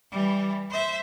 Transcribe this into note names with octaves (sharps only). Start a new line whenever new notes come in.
E3 G3
C5 E5